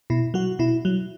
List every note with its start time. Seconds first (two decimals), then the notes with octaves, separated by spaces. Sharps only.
0.10 B2 E4
0.34 F#3 F#4
0.59 B2 E4
0.85 F#3